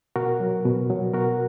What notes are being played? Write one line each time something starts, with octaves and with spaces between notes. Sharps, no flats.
B2 F#4 A#4
F#3
B2
F#3
B2 F#4 A#4